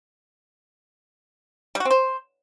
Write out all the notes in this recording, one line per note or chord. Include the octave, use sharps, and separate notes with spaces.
G3
F#4
C4
C5